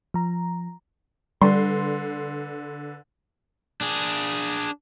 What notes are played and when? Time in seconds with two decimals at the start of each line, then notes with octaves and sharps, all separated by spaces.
0.14 F3 A#5
1.41 D3 G3 B4 C6
3.81 D4 G#4